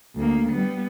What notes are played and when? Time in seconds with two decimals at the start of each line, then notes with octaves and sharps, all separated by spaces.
0.16 D2 A#3
0.52 G3 B3